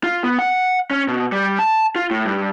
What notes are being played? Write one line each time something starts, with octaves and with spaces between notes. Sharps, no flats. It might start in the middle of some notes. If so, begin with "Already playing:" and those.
F4
B3
F#5
C#4
B2
G3
A5
F4
A2
G2